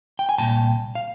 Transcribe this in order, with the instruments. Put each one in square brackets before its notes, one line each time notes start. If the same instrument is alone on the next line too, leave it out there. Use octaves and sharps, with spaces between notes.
[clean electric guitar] G5
G#5
C2 A#2 G5 A5
F5